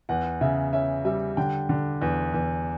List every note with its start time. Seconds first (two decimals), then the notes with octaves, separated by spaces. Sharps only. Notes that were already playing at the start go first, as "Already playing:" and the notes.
0.09 E2 F#5
0.41 C#3 E5
0.73 C#4 E5
1.05 G3 E5
1.37 D3 G5
1.69 D3
2.01 E2
2.33 E2